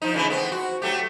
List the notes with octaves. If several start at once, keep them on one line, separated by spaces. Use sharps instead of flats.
F3 D#4
C#3 E3 A3
B3 C4
F#4
F#3 A3 G4